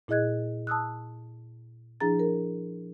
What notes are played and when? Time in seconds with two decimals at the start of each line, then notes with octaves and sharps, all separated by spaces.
0.08 A#2 E4 G#4 D#5 F#6 G#6
0.67 A5 D#6 E6 F#6
2.00 F3 D4 E4 G#4 A#5 A6
2.19 A#4